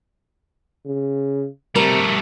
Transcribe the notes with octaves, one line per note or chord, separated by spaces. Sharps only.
C#3
C3 G3 A3 A#4